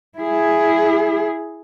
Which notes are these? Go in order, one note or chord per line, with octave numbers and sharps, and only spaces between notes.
E4 G#4